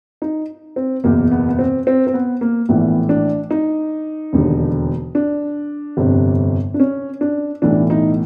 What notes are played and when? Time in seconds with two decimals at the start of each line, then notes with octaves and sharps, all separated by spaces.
0.22 D#4
0.76 C4
1.04 F#1 E2 B2 A#3
1.31 B3
1.49 B3
1.59 C4
1.87 C4
2.07 C4
2.14 B3
2.41 A#3
2.69 A#1 A2 E3 B3
3.09 D4
3.51 D#4
4.33 E1 D#2 D3
5.15 D4
5.97 G1 F2 C3
6.74 D4
6.80 C#4
7.21 D4
7.62 B1 A2 E3 D4
7.90 D#4